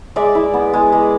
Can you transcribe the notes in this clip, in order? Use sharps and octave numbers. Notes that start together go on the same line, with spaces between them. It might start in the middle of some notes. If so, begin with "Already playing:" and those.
G#3 D5 E5
E4
B3
G#3
G#3